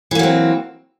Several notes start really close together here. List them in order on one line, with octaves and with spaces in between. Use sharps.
E3 A#3 F#3 C4